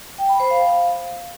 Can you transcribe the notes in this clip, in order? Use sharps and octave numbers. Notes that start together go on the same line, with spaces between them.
G5
B5
C5
F5